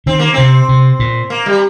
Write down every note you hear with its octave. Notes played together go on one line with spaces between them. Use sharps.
D#3 C4
A#3
C3 C4
C3
A#2
A#3
G3